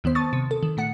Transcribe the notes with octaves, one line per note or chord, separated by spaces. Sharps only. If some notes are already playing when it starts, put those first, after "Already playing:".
D#2 D#3 B3 C5
A5 C#6 D#6 A6
C3
A4
D#3
A#2 A3 F#5 C#7